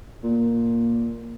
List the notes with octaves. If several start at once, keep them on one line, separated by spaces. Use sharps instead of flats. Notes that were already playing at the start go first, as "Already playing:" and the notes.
A#2